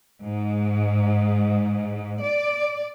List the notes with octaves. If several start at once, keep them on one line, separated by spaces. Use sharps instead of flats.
G#2
D5